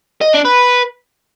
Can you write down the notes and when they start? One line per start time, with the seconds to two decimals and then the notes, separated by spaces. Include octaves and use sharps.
0.22 D#5
0.33 D4
0.45 B4